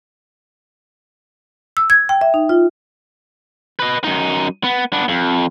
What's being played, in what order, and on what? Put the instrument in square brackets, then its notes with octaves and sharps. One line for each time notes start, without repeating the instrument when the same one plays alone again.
[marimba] E6
G#6
G5
E5
D#4
F4
[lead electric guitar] B4 D#5
F#2 D#4
B3
B3 D4
F2